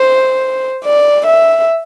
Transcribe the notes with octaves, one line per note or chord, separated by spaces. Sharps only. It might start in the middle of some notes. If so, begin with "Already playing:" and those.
Already playing: C5
D5
E5